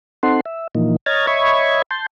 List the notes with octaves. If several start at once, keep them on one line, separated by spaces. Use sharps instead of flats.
C4 D#4 A4 F#5 C6
E5
A#2 E3 F3 A#3 D#4
C#5 D#5 A#5 F6 G#6 A6
C#5 D#5 E5 B5 C#6 G#6
A5 C6 G6